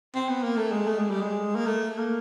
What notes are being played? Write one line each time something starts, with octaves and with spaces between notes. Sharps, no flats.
C4
B3
A#3
A3
G#3
A3
G#3
G3
G#3
A#3
A3
A#3